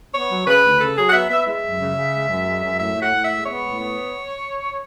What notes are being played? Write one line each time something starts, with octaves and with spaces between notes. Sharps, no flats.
B3 C#5
F#3
C#3 B4
D2
C#3 A4
F#3 G#4
F#5
B3 E5
B3 E5
G#3 E5
F#2
C#3
C#3
G#3
F#2
G#3
F#2
A2 E5
A2
F#5
A2
E5
G#3
B3 C#5
A2
B3